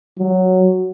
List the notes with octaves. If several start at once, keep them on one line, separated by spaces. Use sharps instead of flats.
F#3